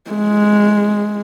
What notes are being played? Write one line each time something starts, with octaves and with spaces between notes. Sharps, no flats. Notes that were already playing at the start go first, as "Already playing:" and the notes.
G#3